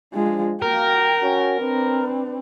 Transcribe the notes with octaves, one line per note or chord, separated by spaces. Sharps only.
F3 G#3 D4 F4
A#3 F#4 A#4 G5
C#4 F#4
C4 D4 B4